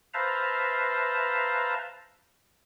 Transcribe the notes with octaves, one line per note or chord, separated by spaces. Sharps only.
B4 C5 E5 F5 A5 A#5